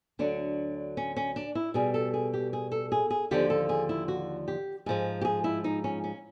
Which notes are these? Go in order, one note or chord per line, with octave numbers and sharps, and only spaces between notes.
D2 D3 F#3 D4
C#4
C#4
D4
E4
B2 G3 G#4
A4
G#4
G4
G#4
A4
G#4
G#4
D#2 D3 F3 G4
A4
G#4
E4
F#4
G4
G#2 F3 G#3 G#4
G4
G#4
E4
D#4
C#4
C#4